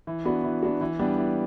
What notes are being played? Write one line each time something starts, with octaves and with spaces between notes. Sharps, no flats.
E3
B3 D4 F#4
E3
B3 D4 F#4
E3
G3 B3 D4
E3